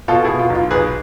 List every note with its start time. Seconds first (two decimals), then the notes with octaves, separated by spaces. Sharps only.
0.08 B2 F4 A4
0.24 E4 G#4
0.29 B2
0.39 F4
0.50 B1
0.55 F4
0.71 B1 G#4 B4